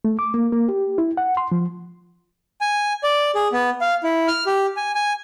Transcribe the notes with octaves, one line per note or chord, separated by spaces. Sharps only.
A3
D6
A#3
A#3
G4
E4
F#5
C6
F3
G#5
D5
G#4
B3
F5
E4
F6
G4
G#5
G#5